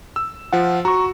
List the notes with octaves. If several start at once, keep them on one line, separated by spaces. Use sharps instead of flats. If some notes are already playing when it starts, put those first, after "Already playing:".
E6
F3 F4 F#5
F#4 A#5 C#6